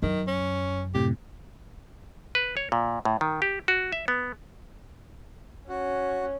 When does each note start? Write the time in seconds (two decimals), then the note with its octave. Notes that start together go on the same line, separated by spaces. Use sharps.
0.02 F#2 D#3
0.28 C#4
0.95 A2 C3 G4
2.35 B4
2.57 C#5
2.72 A#2
3.05 A2
3.21 D#3
3.42 G4
3.68 F#4
3.92 E5
4.08 B3
5.69 C#4 F#4